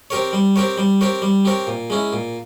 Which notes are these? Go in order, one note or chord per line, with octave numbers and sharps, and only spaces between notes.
C4 G4 A#4 C#5
G3
C4 G4 A#4 C#5
G3
C4 G4 A#4 C#5
G3
C4 G4 A#4 C#5
A#2
G#3 C#4 E4
A#2